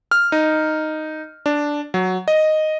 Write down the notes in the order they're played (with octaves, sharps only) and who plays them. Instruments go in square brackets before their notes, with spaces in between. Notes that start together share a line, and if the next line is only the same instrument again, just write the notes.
[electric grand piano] F6
D#4
D4
F#3
D#5